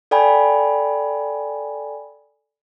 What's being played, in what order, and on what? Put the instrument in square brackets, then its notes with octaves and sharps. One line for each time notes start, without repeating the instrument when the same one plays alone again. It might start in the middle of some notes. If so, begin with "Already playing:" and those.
[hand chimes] A4 D5 G5 G#5 B5